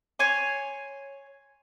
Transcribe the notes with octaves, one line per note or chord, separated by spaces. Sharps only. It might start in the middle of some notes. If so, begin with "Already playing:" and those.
C#5 G#5 C6